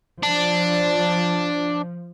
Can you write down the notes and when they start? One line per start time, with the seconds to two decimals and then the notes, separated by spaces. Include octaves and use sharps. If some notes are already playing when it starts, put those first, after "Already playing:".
0.23 F3 D4